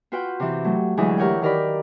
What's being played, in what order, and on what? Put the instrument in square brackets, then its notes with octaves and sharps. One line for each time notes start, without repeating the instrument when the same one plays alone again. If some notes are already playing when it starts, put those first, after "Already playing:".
[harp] F4 F#4 B4 F#5 G5
C3 E3
F#3 A3
D2 E3 F#3 G#3 E4 G#4
G4 A#4 C#5 F#5 G5
D#3 G4 A#4 D5 B5